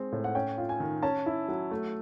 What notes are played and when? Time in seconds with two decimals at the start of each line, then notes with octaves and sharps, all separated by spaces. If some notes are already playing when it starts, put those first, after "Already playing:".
Already playing: G#3 C4
0.12 A2
0.24 F#5
0.35 C#4 G5
0.58 F4
0.69 G#5
0.80 D#3
1.02 C#4 A5
1.26 E4
1.48 F#3
1.71 A3